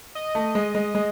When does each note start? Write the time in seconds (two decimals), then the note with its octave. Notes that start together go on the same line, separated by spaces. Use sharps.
0.15 D#5
0.35 A3
0.55 G#3
0.75 G#3
0.95 G#3